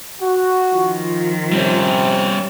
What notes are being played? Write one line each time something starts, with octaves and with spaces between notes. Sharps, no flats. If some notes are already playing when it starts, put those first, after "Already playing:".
F#4
D#3 F3 F4
C3 G3 C#4